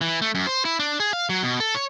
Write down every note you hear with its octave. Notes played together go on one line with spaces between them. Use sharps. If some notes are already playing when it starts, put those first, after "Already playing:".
E3
A3
F#2
C5
E4
D4
G#4
F5
F#3
B2
A4
C#5